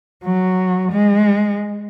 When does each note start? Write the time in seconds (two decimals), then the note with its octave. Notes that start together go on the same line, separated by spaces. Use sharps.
0.24 F#3
0.92 G#3